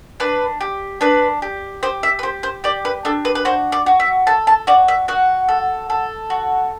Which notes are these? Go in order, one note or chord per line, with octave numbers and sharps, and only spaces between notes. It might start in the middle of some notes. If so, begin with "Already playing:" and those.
D4 B4
G4
D4 B4
G4
G4 C5
E5
B4
G4 C5
C5
G4 D5
B4
D4 A4
B4
B4
F#4 C5
D5
F#4
E5
A4 A5
A5
F#4 D5
E5
F#4 F#5
A4
A4
F#4